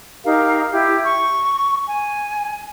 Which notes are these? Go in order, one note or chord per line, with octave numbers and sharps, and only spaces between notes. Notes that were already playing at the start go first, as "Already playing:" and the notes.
D#4 G4 A#4 F5
E4 G4
C#6
G#5